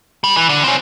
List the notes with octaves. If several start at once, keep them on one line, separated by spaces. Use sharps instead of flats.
G3
E3
D3
C4 C#4